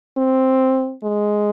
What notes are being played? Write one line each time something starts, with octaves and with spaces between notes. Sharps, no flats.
C4
G#3